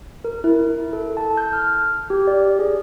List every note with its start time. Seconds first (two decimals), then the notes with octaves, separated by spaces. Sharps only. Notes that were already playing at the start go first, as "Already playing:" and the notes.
0.24 A#4
0.44 E4
0.93 A4
1.17 A5
1.37 G6
1.53 F6
2.10 G4
2.27 D5
2.59 G#4